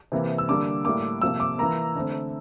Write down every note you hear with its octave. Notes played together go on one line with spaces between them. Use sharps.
C3 E3 A#3
E6
D3 G3 A#3 D6
A2 G3 A#3 D6
C3 F3 A#3 E6
D6
E3 A#3 A#5
D3 A3 C4